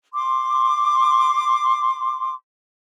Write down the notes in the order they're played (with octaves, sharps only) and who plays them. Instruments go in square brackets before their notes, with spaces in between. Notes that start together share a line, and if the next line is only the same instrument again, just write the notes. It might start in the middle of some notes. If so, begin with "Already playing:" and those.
[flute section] C6 D6